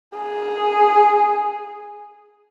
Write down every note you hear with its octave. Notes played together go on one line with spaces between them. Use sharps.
G#4